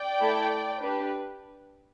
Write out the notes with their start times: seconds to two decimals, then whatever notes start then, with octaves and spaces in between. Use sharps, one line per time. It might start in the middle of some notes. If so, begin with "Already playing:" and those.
Already playing: D5 G5
0.20 A3 E4 A4
0.81 D4 G4 B4